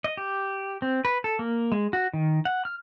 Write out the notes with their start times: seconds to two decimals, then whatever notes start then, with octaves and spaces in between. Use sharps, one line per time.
0.04 D#5
0.17 G4
0.82 C4
1.05 B4
1.24 A4
1.39 A#3
1.72 G#3
1.93 F#4
2.13 D#3
2.45 F#5
2.65 F6